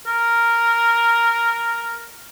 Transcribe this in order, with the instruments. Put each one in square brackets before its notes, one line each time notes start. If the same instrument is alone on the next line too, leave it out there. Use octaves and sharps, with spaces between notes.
[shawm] A#4